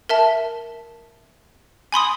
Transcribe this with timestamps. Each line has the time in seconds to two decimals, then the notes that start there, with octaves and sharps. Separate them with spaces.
0.09 A#4 E5 A5
1.92 G#5 B5 C6 D#6